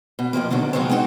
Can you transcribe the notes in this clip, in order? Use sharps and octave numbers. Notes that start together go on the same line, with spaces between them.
B2
F2 C3 F3 A#3
B2 D3 D#3 F#3
C#3 F3 F#3 G#3 B3 C4
G#3 C4 D#4 F#4